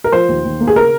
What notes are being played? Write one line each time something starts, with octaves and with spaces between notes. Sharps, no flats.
A#4
F3 C5
D#2
D#2
A#3
G#4
C#3 A#4